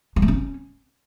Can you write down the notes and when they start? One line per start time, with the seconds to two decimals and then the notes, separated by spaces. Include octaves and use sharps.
0.16 F#3
0.22 A3
0.28 C#4